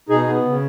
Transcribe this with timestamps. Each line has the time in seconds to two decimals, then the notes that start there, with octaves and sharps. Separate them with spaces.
0.09 B2 D#4 G#4
0.27 B3
0.45 C#3